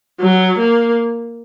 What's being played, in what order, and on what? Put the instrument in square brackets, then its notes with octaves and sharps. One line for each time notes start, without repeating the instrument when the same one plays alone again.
[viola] F#3
A#3